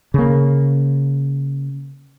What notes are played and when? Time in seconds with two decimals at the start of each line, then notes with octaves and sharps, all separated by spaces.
0.14 C#3 A#3